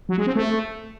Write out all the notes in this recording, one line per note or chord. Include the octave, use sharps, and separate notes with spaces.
F#3
G#3
C4
A3